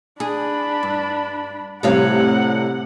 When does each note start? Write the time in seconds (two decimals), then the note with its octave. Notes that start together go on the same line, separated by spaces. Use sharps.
0.20 D4 G#4 B5
0.83 G2
1.83 A2 C3 G3 C#5 F5 F#5